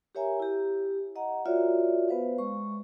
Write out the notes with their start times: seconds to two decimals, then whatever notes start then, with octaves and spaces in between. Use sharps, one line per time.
0.15 G4 A#4 C#5 E5 G#5 A#5
0.40 E4 G4
1.16 D#5 F#5 A#5
1.46 F4 F#4 A#4 C#5 D5 E5
2.09 B3 B4 C5 F5
2.38 G#3 C#6